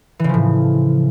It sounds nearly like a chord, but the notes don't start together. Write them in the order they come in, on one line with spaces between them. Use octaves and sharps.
E3 C#3 F3 A2